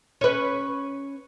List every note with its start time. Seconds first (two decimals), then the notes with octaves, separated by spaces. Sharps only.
0.21 C#4 B4